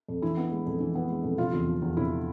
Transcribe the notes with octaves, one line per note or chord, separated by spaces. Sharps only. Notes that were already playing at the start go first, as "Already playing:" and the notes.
F2
E3 E4
B3
G#3
F2
E3
B3
G#3
F2
C3 F4
E2
F3
E2
C3 E4